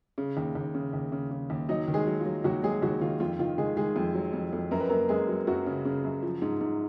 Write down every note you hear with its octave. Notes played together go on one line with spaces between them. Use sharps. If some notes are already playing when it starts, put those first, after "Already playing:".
C#3
D#2
D#2
C#3
D#2
C#3
C#3
D#2
F#3 D#4 D#5
D#3
G#3 G#4
F#3
F4
F#3
D#2 F#3 F#4
F#3 G#3 G#4
D#2 F#3 F#4
D#3 F4
F2 F4
D#3 F4
D#3 G#3 G#4
D#3 G#3 G#4
F2
F#3
F2
F2
F#2 A#4
B4
F#2 A#3 A#4
F#2 G#3 G#4
F#3
F#2 F#3 F#4
C#3
C#3
F#2
F3
G#2
G#2